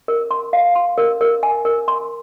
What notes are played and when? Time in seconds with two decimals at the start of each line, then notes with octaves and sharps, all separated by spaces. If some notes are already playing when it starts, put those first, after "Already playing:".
0.08 A#4
0.31 C6
0.53 F5
0.75 C6
0.98 A#4
1.21 A#4
1.43 G#5
1.65 A#4
1.88 C6